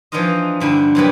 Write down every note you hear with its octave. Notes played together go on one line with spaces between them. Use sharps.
E3 F3 D4 D#4 F4 D#5
G2 D3 D4 E4
C3 E3 F#3 G3 A#3 B3